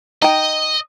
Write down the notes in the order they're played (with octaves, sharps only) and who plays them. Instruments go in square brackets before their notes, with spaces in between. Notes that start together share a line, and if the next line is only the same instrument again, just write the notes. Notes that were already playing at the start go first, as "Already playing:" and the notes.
[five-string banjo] D#4 G5 [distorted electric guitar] D#5